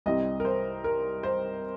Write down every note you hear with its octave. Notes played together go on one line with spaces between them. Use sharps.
C2 C3 G3 C4 D#5
A#4
C5
A#4
C5